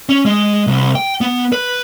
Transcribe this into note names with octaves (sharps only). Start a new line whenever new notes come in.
C#4
G#3
C2
G5
B3
B4